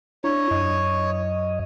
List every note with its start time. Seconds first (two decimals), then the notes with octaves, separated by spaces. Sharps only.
0.24 D4 E4 C#5 A#5
0.51 F#2 D#5